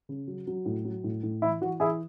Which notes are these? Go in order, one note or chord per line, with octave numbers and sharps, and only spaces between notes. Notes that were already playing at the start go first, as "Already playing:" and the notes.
C#3
F#3
F#3
A2
F#3
A2
A2
E3 E4
E3 F#4
E3 E4 G#4